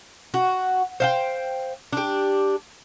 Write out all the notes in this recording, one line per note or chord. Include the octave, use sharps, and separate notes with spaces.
F#4
C5 F5 G5
D4 G4